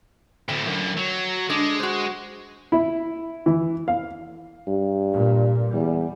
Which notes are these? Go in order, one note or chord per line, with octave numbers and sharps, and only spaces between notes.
D2 A2 G5
F#2 D3
F#3
D3 G#3 D4
F#4 C5
E4
E3
F5
G2
A#2
E2 G3